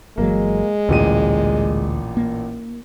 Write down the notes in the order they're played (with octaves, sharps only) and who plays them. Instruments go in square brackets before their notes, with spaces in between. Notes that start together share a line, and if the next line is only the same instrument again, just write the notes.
[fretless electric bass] G1 E3 F#3 [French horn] G#3 [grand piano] A#3
[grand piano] A1 A#2 D#7 [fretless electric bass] D2
[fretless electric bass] A#3